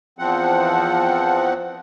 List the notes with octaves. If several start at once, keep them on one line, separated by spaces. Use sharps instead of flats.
E2 F3 C4 F#5